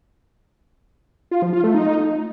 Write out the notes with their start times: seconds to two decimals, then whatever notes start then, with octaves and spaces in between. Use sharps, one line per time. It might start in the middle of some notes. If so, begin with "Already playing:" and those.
1.31 F4
1.42 F3
1.53 F4
1.64 A3
1.75 D#4